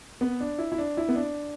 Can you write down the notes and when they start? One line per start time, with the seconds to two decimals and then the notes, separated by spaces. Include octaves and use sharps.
0.21 B3
0.40 D4
0.59 E4
0.72 E4
0.78 D4
0.97 E4
1.09 B3
1.15 D4